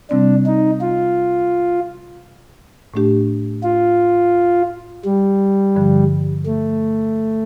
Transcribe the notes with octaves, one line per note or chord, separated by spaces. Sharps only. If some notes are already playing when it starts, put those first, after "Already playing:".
C3 G3 C4 D4
D#4
F4
A2 A3 D4 G4
F4
G3
G2 D3 F3
A3